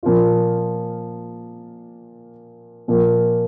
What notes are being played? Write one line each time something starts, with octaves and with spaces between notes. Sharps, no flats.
A#2 F3 A#3 F4
A#2 F3 A#3